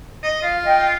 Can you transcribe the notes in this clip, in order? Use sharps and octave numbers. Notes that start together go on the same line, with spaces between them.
D#5
F4 F5
D#5 G5